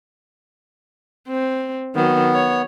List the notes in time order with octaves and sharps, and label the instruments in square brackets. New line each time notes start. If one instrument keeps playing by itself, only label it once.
[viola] C4
[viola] D#3 F#3 [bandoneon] B3
[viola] C#5